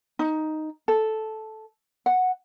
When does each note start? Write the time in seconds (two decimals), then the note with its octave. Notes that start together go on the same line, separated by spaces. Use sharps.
0.19 D#4
0.88 A4
2.06 F#5